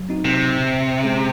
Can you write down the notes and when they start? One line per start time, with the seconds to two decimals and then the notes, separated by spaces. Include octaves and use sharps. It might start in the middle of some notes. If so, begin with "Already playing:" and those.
Already playing: F#3
0.09 C4 D#4 F#4
0.25 C3
0.56 A#2
1.03 G#3 C#4 G#4 C5